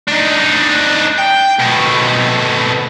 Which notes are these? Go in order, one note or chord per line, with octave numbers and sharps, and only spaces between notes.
D4 D#4
G5
B2 A3